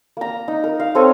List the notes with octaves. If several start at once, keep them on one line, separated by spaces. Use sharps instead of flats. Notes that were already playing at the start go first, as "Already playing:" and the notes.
A#3 A#5
D#4
A#4
F5
C4 A4 C#5 G#5